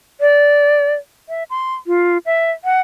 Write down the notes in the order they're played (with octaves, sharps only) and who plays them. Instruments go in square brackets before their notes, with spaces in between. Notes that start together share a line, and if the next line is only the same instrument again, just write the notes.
[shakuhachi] D5
E5
C6
F4
E5
F#5